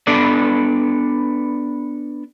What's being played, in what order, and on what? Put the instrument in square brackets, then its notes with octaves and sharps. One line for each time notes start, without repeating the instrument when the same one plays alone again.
[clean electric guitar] B3 D4 A4 B4 D5